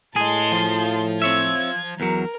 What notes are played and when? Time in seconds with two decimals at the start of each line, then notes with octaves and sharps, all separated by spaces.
0.16 A2 G#4 D#5 G#5 A5 C6
0.52 F3
1.22 C4 C#5 E5 G#6
2.00 E2 F#3 A#4